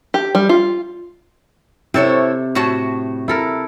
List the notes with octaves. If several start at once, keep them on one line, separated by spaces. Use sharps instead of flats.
G4
G3
F4
C3 E4 A4 C#5
A2 F#4 A5
E4 A4 A#4